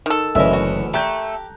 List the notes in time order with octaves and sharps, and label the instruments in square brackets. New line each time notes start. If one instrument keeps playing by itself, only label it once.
[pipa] D#3 A4
[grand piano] F#1 C#4 D#5 [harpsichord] D2 E3 [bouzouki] E5
[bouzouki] F#4
[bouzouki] A3 [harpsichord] G4 [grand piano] A#5 F#6 G6